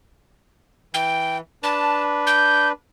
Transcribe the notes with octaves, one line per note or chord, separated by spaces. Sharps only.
E3 G5
D4 B4 A5
G6